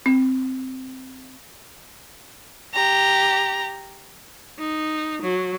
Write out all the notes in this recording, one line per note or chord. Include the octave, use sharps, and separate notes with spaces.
C4
G4 A#5
D#4
F#3